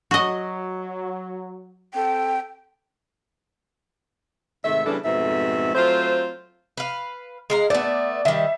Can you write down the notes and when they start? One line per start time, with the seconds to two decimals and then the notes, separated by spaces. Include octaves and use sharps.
0.11 F#3 F#4 D#5
1.94 C4 A4 G5
4.64 G#2 C3 D#3 A3 E5
4.86 C#3 E3 G3 B3 D4 A4
5.05 F2 G#2 B2 A3 C4 E5
5.75 F#3 A3 C4 F4 C5
6.77 B4 F5
7.50 G#3 F5 A#5
7.70 A3 B3 D5
8.25 D#3 G3 E5